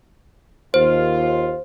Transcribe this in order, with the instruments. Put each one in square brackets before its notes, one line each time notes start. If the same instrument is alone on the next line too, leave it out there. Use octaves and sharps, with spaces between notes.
[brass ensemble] D#2 F4 [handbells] C5